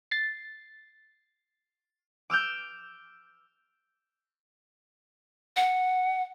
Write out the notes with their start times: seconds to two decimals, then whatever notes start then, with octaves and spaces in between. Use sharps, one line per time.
0.11 A6 C7
2.30 D6 E6 F6 G6
5.56 F#5